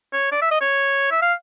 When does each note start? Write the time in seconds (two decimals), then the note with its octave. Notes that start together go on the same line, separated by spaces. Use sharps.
0.13 C#5
0.32 D5
0.42 E5
0.51 D#5
0.61 C#5
1.11 E5
1.22 F5